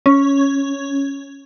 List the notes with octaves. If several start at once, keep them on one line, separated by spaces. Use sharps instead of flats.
C#4